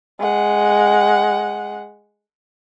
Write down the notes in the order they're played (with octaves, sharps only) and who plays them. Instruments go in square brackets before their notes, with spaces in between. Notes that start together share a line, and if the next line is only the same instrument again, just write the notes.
[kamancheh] G#3 F#5